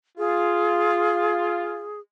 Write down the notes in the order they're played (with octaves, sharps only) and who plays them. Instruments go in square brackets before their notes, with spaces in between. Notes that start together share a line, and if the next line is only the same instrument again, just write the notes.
[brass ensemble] F4 [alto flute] G#4